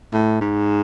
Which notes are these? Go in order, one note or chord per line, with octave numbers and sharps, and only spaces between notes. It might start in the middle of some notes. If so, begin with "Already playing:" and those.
A2
G#2